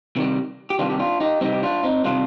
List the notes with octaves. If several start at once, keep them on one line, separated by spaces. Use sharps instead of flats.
C3 D#3 G3
G4
C3 D#3 G3 D4 F4
G4
D4 F4
D#4 G4
C3 D#3 G3 C4 D#4
G4
D4 F4
C4 D#4
C3 D#3 G3 D4 F4